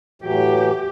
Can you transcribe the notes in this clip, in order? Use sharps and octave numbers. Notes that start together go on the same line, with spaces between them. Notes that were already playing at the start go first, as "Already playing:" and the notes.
A2 E3 F#3 G4